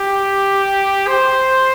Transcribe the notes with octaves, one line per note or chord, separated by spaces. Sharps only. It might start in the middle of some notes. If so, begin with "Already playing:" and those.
Already playing: G4
C5